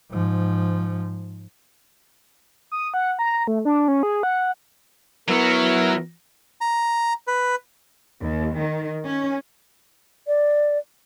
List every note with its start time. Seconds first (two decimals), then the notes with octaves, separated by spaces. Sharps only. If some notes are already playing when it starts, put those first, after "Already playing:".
0.11 G#2 F3
2.72 D#6
2.94 F#5
3.19 A#5
3.47 A3
3.65 D4
3.88 C#4
4.03 G#4
4.23 F#5
5.29 F#3 B3 E4 A#4 C#5
6.61 A#5
7.27 B4
8.21 D#2
8.58 D#3
9.06 C#4
10.27 D5